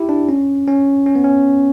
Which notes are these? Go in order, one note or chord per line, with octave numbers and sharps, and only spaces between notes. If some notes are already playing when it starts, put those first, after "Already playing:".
Already playing: E4 G4
D4
C#4
C#4
C#4
B3
C#4